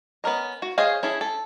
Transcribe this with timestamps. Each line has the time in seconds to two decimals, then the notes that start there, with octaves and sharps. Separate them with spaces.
0.24 B3 C#4 A#4 D#5
0.62 F#4
0.78 G#4 C5 C#5 D#5 F5
1.03 C#4 E4 G#4 A4
1.21 A4